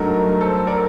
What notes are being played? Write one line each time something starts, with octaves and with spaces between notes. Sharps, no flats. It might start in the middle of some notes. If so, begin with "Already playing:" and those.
Already playing: G2 F#3 A3 D#4 A#4
A#4
A4 C5
A#4 D5